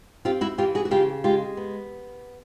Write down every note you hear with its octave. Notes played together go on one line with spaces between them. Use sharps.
C4 F4 G4
E4 F#4
E3 F4 G4
F#4 G#4
F#4
C#3 F4 G4
G#3 F4 G4
B3